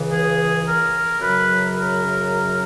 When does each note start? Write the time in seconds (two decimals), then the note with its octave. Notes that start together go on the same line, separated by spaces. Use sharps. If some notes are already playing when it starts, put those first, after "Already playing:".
Already playing: C#2 C#3 E3
0.11 G#4
0.65 A#4
1.19 F#2 C#3 F#3 B4
1.74 A#4